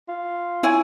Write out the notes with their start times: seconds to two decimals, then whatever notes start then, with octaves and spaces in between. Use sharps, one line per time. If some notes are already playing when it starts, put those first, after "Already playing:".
0.08 F4
0.63 E4 C#5 G#5